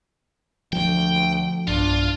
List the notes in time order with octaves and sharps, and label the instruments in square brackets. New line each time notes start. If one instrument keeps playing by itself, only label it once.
[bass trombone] D2 [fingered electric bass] F3 [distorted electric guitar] G5
[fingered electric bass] B1 G2 [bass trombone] D4 [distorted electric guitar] F4